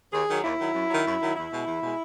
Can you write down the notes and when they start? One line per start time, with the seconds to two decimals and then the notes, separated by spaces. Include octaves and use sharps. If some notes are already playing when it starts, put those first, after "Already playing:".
0.13 D#2 G#4
0.28 D#3 F#3
0.43 D#2 E4
0.58 D#3 F#3
0.74 F#2
0.90 D#3 F#3
1.05 F#2
1.20 D#3 F#3
1.36 E2 E4
1.51 B2 G#3
1.67 E2
1.82 B2 G#3